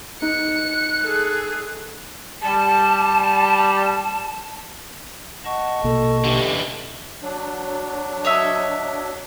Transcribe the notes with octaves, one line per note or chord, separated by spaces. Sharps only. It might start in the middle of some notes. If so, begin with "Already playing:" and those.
D#4 F#6 C#7
G#4 A4
G3 A5
D#5 F#5 A5 C#6
A#1 B2 A#3 A4
D3 E3 G4
F#3 D4
C#5 D#5 E5